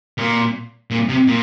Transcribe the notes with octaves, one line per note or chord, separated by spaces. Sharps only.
A#2
A#2
C3
A#2